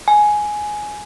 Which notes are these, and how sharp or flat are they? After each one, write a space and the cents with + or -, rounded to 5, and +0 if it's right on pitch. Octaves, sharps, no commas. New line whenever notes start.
G#5 +10